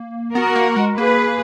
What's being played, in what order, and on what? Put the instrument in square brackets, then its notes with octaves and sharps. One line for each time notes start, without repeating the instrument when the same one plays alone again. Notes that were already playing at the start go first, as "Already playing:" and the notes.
Already playing: [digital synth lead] A#3
[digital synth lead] B3 [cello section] F#4 A#4
[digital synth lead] A#3
G#3
[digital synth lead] A#3 [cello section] G#4 B4